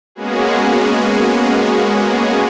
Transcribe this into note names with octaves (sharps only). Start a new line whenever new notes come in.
G#3 A#3 B3 C#4 F#4 G#4